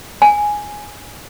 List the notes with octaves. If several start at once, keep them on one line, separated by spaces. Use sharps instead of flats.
G#5